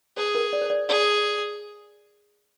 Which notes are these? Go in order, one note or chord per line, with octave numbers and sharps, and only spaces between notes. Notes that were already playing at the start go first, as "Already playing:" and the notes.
G#4 C5
A#4
D5
C5
D5
G#4 D5